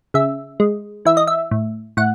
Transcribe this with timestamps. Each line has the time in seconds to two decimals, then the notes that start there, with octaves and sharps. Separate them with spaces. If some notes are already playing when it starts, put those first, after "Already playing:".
0.14 C#3 E5
0.60 G#3
1.05 E3 E5
1.17 D#5
1.27 E5
1.51 A2
1.97 A2 F#5